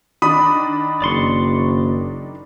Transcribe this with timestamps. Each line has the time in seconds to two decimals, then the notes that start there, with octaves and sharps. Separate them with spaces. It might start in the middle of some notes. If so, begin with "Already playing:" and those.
0.22 D#3 D4 B5 D#6
1.02 F#1 D5 C6 C#6